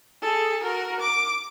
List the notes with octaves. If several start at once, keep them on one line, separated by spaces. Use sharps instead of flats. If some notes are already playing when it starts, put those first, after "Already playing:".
G#4 A4
F#4 A#4
D6